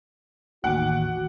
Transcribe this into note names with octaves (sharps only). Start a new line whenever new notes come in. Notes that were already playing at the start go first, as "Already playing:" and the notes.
A1 D#2 F#4 F#5 D6